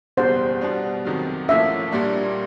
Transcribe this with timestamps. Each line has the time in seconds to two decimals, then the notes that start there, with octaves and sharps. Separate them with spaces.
0.17 F#1 E2 B2 G3 C5
0.61 B2 G3 B3 D4
1.05 F2 C3 D#3 F#3
1.48 A1 A2 F3 A#3 C#4 E5
1.92 A#1 A#2 G3 A#3 D4